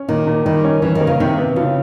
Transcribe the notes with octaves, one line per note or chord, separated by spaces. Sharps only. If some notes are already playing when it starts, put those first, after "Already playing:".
Already playing: C#4
A#2 D#3
A#2
D#3 G3
C#4
E3 C#4
D#3
A#3
C#3
C3 D#3
B3
C#3 F3